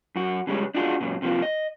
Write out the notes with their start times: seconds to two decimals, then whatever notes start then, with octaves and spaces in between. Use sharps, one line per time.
0.16 F#2 F#4
0.47 C#3 G3 G#3 C#4
0.75 D4 D#4 F4 F#4 G#4
1.01 F#2 A#2 C#3
1.22 C3 F3 A#3 F4
1.42 D#5